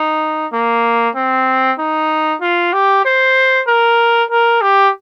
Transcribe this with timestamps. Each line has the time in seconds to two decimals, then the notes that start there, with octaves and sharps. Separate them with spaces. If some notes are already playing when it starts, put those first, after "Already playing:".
Already playing: D#4
0.53 A#3
1.16 C4
1.79 D#4
2.42 F4
2.73 G4
3.05 C5
3.67 A#4
4.31 A#4
4.62 G4